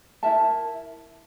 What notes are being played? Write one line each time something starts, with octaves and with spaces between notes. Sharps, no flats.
E4 A#4 E5 A5